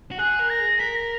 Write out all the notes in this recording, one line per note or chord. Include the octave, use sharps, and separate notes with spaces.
F#4
G#4 F#6
A#4
A#6
G#4
A#4 B6
A#6